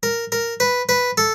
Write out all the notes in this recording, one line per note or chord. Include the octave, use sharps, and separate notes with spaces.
A#4
A#4
B4
B4
A4